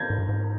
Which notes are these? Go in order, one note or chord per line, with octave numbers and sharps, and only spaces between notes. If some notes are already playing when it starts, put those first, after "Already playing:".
Already playing: G6 G#6 A#6
G#2
G2
G#2